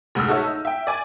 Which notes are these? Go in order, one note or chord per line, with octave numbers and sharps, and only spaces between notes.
F1 D2 G#2 E6 F6
G#3 D#4 F#4 A4 C#5 E5
D#4
E5 G5
D5 G#5 D6